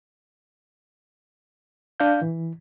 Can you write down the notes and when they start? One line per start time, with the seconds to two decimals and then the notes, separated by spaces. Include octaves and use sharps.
2.00 D4 F5 G6
2.22 E3